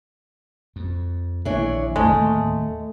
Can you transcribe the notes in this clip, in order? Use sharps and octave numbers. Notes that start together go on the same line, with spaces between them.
F2
A#1 A#2 D#3 E3 D4 C#5
D1 G1 D#2 G#3 A3